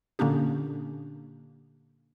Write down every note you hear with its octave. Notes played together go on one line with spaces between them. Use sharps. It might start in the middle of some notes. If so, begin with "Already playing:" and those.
A#2 D3 A#3 C#4 D4 G4